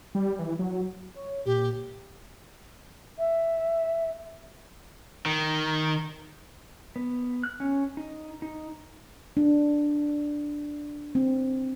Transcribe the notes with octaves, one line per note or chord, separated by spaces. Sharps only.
G3
E3
F#3
C#5
A#2 G4
E5
D#3
B3
F#6
C#4
D#4
D#4
D4
C4